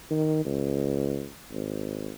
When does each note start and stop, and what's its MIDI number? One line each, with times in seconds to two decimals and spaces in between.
0.11 0.42 51
0.45 1.28 37
1.52 2.11 32